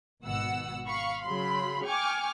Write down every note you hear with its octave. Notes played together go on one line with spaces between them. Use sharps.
G#1 B2 F#5 E6
F5 B5 C#6
C#3 F#3 B5 C6
G5 G#5 C#6 D6 F6